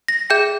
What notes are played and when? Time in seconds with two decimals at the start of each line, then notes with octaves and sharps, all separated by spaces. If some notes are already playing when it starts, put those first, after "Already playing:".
0.08 A#6
0.30 G#4 E5 G5 G6